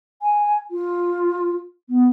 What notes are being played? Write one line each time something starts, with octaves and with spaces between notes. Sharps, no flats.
G#5
F4
B3